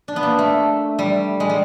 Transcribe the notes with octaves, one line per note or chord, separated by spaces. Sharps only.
D4
B3
A#3
A3
G3
G#3
G3